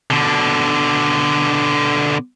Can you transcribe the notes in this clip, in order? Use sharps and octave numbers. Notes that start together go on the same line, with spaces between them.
B2 D3